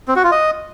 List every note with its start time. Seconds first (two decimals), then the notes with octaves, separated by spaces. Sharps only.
0.08 C4
0.16 F#4
0.24 F4
0.32 D#5